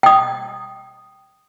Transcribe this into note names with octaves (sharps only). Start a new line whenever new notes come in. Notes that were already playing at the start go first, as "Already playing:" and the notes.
G5 D#6